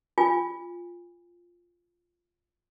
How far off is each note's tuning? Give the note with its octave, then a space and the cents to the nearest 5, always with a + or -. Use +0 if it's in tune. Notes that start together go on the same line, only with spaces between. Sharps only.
F4 +0 G#5 -30